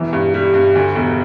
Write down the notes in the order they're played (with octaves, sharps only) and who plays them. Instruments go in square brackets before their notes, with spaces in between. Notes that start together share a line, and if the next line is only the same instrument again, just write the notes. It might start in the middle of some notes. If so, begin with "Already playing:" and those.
Already playing: [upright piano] E1 E3
G2
G3
G2
D2
E1